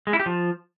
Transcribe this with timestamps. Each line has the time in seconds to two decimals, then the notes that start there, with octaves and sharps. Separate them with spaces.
0.07 G#3
0.13 E4
0.20 G4
0.26 F3